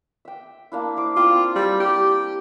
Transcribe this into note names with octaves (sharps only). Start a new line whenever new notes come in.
E5 G5
A#3 D4 E4
E4 C5 D6
C4 F4
G3
G4 D6